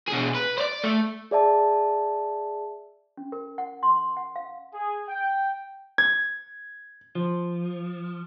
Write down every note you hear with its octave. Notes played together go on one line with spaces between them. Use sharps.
B2 G#4
B4
C5 D5
A3
G#4 D5 E5 A5
C#4
A#4
F#5
C6
F#5
F5
G#4
G5
G#6
F3